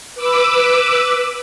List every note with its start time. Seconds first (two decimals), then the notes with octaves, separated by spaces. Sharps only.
0.15 B4 D6 E6